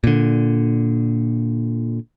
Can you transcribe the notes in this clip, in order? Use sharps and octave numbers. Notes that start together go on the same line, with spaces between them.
A#2 D3